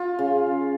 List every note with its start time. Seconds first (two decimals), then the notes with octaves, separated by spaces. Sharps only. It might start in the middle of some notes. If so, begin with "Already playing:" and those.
Already playing: F4
0.19 C#3